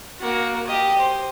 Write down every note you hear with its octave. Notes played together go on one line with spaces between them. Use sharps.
A#3 F#4
G4 D#5
C5